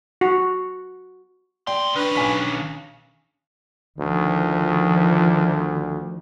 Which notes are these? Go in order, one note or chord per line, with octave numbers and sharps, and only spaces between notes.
F#4
D#2 D5 G5 C6
D#3 C#4 D4 B4
B1 G#5 B6
D2 D#3 F3